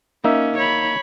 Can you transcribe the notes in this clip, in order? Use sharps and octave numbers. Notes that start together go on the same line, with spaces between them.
A#3 C#4 D#4 E5
C#5 B5